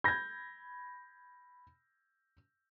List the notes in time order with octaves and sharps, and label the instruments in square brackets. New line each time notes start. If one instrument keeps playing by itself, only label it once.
[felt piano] B5 G#6 [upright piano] G6 A#6